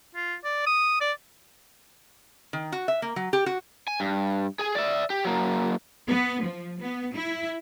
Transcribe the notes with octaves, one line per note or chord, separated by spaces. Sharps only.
F4
D5
D#6
D5
D#3
F#4
E5
A#3
F#3
G4
F#4
G#5
G2
G#4 G#5
D5 E5
G4
F#3 A#3
B3
F3
B3
E4